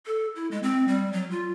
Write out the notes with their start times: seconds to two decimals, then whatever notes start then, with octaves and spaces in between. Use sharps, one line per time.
0.06 A4
0.36 E4
0.51 G#3
0.63 C4
0.88 G3
1.13 F#3
1.31 F4